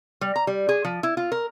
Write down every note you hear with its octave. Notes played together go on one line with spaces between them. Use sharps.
G3
A#5
G3
G#4
F3
E4
F4
A#4